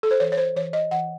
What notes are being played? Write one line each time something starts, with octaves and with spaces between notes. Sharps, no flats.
A4
C5
E3 C#5
C#5
C5
E3 C#5
D#5
E3 F#5